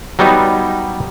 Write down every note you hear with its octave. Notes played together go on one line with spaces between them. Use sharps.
F#3 G3 B3 D#4